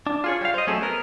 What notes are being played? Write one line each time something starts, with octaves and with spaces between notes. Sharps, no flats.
D4
F4 G#4 C#5
G3 F5
C5 D#5
F#3 A3 C4 C#4 G#4 A4
B3 A#4